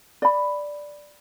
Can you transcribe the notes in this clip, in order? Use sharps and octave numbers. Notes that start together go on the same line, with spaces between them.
D5 B5